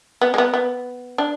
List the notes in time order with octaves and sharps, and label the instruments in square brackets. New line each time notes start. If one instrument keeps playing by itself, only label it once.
[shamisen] B3
G#3
B3
B3
D4